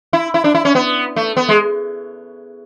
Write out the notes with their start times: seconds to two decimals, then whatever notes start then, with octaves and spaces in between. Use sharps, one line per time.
0.13 E4
0.34 E4
0.44 D4
0.55 E4
0.65 C#4
0.75 B3
1.16 A3
1.37 B3
1.49 G#3